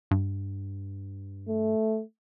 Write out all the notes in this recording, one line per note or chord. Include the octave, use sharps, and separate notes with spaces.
G2
A3